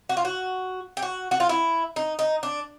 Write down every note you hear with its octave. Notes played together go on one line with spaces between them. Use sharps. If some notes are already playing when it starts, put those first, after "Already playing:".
F#4
F4
F#4
G4
F#4
F#4
F4
E4
D#4
D#4
D4